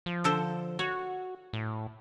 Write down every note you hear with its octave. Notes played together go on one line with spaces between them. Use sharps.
F3
D3 A4 C5
F#4 C#5
A2